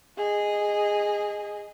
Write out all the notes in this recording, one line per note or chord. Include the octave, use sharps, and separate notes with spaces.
G#4 D#5